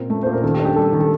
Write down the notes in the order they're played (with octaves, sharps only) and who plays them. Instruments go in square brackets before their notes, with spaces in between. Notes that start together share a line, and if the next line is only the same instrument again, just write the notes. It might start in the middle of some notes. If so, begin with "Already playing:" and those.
Already playing: [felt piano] A#2 C4 [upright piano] A#4
[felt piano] A3
[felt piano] A#2 [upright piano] C5
[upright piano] A#4
[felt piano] D#3 [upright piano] A4
[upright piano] G4
[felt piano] D4
[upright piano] G4
[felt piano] G3 [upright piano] A4
[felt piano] D#3
[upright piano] A4